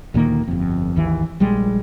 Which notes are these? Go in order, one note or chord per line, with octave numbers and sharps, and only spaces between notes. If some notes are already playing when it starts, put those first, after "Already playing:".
D2 A#2 D#3 A#3
G1 F2
G#1 D#2 E3
A#1 G3 G#3